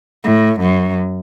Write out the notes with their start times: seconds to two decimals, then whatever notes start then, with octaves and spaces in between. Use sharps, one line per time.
0.24 A2
0.61 F#2